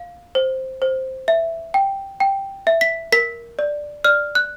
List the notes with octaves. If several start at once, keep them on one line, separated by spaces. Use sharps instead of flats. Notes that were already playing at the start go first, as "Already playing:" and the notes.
Already playing: F5
C5
C5
E5
G5
G5
E5
B6
A#4 B6
D5
D5 F6
F#6